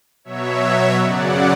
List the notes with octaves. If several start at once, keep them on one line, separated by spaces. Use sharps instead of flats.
B2 F#3 C#5 E5
F#2 C#3 F#3 D5 F#5